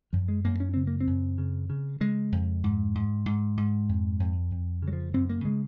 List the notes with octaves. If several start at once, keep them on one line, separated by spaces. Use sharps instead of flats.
F#2 F3
G#3
F#2 A#3
C#4
C#3 C4
A#3
C4
F#2
C#3
C#3
C#3 G#3
F2
G#2
G#2
G#2
G#2
F2
F2
F2
C#3
F#3
F3
F#2 C4
A#3
C#3 G#3